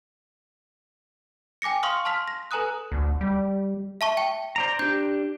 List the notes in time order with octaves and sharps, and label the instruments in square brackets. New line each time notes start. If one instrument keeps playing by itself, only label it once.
[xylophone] G5 G#5 D6 A#6 C#7
F5 C6 C#6 D#6 F6
A5 C6 F6 B6 F7
A#6
A4 B4 G#5 A#5 D#6 F#6
[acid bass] D2
G3
[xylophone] E5 A5 C#6
G5
[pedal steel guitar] C5 D5 A#5
[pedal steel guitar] D4 G4 [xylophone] G6